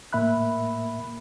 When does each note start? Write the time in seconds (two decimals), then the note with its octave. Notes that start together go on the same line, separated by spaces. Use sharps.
0.13 A2 A#3 E5 B5 F#6